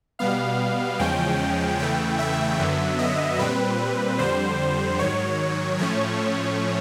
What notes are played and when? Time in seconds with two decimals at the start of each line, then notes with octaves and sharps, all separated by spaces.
0.19 B2 G3 B3 F5
0.99 E2 C#3 F3 G#3 C#4 G5
1.79 E2 C#3 E3 A3 G5
2.19 E5
2.59 F#2 D3 F#3 B3
2.99 D#5
3.39 A#2 G3 C4 B4
4.19 F2 D3 G3 C5
4.99 G#2 D#3 F#3 C#5
5.79 A2 F3 A3 C#4 C#5